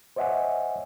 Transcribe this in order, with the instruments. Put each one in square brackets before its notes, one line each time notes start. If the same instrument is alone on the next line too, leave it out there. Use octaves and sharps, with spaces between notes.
[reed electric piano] C5 C#5 D#5 E5 F#5 G#5